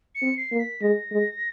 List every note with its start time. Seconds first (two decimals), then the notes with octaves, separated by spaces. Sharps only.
0.15 C#7
0.22 C4
0.37 C7
0.52 A#3
0.59 B6
0.82 G#3 A#6
1.11 G#3